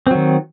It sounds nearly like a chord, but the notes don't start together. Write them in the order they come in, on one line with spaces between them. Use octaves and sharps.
C4 F#3 D#3